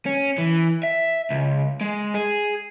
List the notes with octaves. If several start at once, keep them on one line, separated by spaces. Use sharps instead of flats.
C#4
E3
E5
C#2
G#3
G#4